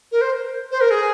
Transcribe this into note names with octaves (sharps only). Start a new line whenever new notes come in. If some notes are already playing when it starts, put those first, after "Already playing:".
A#4
C5
C5
A#4
G#4